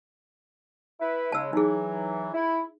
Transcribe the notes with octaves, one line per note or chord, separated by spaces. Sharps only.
E4 B4
C#3 G#3 A5 E6
E3 F#3 D#4 G#4
E4